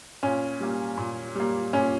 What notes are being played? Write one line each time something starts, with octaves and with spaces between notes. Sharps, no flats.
A#2 C#4
G3 A#3
A#2
G3 A#3
A#2 C#4